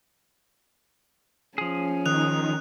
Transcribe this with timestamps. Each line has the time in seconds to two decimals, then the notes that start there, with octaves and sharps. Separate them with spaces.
1.58 F3 C#4 G#4
2.05 D#3 D#6 F#6 F7